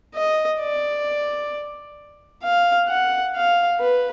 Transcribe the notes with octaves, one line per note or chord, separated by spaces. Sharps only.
D#5
D5
F5
F#5
F5
B4